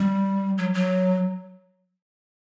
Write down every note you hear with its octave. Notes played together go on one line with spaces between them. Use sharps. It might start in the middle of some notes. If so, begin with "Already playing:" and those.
Already playing: G3
F#3
F#3